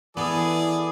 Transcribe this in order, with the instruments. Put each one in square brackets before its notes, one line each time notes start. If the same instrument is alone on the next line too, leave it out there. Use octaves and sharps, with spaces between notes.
[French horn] E3 [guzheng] B3 A4 [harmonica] G#4 D5